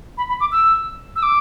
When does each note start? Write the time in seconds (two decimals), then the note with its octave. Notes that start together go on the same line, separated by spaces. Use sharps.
0.18 B5
0.29 B5
0.40 D6
0.52 E6
1.16 E6
1.23 D6